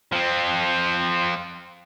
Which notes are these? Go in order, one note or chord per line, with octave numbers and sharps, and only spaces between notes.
F3 C4